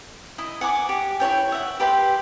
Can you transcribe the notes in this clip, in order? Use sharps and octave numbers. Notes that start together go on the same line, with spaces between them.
E4 D#5
F#5 G#5 C#6 D6
G4
E4 F#4 C#5 G5
E5 F#5
G4 B4 G5 C6